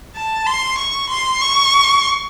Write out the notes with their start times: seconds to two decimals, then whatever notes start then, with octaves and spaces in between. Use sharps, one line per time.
0.16 A5
0.46 C6
0.79 C#6
1.10 C6
1.42 C#6